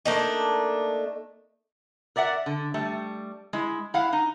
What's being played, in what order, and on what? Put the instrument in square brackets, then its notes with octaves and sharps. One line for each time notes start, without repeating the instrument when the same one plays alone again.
[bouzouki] A3 A#3 D4 D#4
[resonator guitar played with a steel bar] A#4 D5 E5 F#5
D3
G3 A3
G#3 E4
E4 F5 F#5
D#4